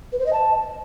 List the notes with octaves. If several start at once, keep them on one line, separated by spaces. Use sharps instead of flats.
B4
C5
D#5
A5